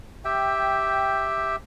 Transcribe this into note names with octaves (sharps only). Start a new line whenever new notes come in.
G4 E5 G5